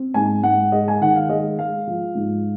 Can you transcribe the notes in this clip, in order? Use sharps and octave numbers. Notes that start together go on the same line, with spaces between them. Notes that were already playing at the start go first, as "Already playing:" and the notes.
Already playing: C4
G#2 G#5
G#2 F#5
G#3 D#5
G#5
D#3 F#5
F5
G#3 D#5
G#3 F5
F3
G#2